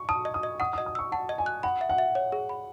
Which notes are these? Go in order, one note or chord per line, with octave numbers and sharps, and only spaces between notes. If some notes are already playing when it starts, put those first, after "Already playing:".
Already playing: C#6
A5 D#6
D#5
D#6
D#5
F#5 D#6
D#6
D#5
D#6
C#6 E6
F#5 A5
D#5
G#5
F#6
F#5 B5
E5
F#5
E5
C#5
G#4
B5